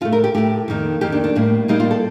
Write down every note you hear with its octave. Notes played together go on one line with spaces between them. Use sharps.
A2 A3 F4
A#4
G4
A2 A3 G4
F2 D#3 A#3
F2 D#3 A#3 G4
D4
D4
A2 G3 A#3
A2 G3 A#3 D#4
F4
A4